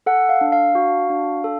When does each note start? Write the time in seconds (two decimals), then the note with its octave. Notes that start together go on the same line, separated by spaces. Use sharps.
0.06 A4 F#5
0.29 F5
0.41 D4
0.52 F5
0.75 F#4
1.10 D4
1.44 A4